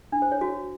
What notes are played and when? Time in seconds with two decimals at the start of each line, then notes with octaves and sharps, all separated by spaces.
0.12 D4
0.22 C5
0.32 C#5
0.41 F#4